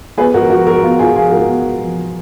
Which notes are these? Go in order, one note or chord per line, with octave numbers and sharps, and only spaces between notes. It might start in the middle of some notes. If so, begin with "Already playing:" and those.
B3 G#4 B4
G#2 F#4 A#4
F3 F#4 A#4
G#2 F#4 A#4
B3 F4
G#2 F4 G#4
F3 F4 G#4
G#2 F#4 A#4
B3
G#2
F3